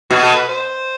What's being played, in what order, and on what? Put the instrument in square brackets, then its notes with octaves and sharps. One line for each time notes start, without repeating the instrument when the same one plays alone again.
[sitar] B2 [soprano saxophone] F#4
[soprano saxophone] A4
B4
C5